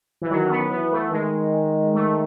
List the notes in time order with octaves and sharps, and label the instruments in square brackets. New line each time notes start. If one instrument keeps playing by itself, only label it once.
[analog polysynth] E3
[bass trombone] D#3 [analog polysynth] F#3
[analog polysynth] C#4
B3
[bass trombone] E3 [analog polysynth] B3
[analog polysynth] A3
[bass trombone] D#3 [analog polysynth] G#3
[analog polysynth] A3